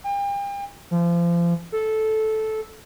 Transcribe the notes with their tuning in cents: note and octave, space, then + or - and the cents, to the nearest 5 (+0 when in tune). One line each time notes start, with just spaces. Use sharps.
G5 +40
F3 -30
A4 -10